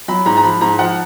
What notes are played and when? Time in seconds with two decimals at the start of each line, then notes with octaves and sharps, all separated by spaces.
0.08 F#3 B5
0.26 G#2 A#5
0.37 A#5
0.43 F3 B5
0.61 G#2 A#5
0.79 F3 F#5